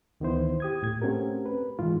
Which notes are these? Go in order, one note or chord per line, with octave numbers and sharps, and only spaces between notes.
D2 D#3 E3 B3 E4 C5
G4 D#6 G#6
A2 G#6
A3 C4 C#4 F#4 G4 A#4
B4
G#2 D#3 E3 G#3 F4